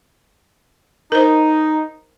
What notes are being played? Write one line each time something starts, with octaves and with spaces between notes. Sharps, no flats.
D#4 A#4 C5